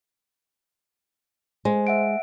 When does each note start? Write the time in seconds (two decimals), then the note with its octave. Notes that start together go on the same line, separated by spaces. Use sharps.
1.65 G#3 C5
1.87 E5 F#5 D7